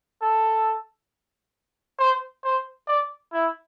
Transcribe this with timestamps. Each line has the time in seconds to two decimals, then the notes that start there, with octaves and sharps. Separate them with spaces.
0.22 A4
1.99 C5
2.44 C5
2.87 D5
3.33 E4